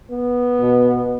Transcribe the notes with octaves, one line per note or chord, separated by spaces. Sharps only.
B3
B2